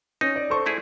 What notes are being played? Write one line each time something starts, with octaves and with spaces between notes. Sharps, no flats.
C#4 D#4
D5
A4 C5 C#6
A3 E4 G#4